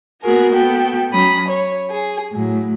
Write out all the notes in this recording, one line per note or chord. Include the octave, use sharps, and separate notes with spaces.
A#3 B3 F#4 G#4 A#4
B3 F#4 A4 G5
F#3 C#4 B5 D#6
C#5
G#4
A2 F#3